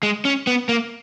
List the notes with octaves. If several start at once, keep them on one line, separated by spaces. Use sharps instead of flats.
G#3
C#4
B3
A#3